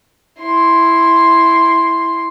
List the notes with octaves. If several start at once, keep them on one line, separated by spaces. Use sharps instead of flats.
E4 C6